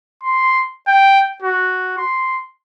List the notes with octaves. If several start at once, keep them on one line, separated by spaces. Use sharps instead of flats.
C6
G5
F#4
C6